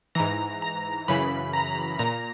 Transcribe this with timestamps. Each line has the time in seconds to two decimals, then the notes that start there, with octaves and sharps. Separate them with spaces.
0.15 G#2 E3 A#5
0.62 A#5
1.08 F#2 C#3 E3 B5
1.53 A#5
1.99 A#2 A#5